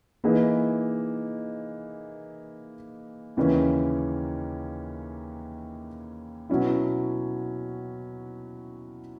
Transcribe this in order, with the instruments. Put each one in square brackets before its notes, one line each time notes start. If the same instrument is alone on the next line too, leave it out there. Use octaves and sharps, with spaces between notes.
[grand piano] E3 A#3 D#4 G#4 B4
D#2 C#3 E3 A#3 C#4
B2 F#3 C#4 E4